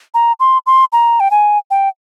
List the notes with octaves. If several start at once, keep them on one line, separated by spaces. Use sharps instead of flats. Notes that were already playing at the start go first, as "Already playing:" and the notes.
A#5
C6
C6
A#5
G5
G#5
G5